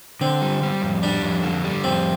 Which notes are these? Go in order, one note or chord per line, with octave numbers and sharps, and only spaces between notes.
D3 C4
G3
G3
F2
G3 D4
F2
D3
G3
F2 C4